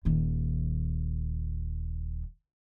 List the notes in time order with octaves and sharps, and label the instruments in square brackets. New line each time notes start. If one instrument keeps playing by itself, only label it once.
[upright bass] D#1 D#3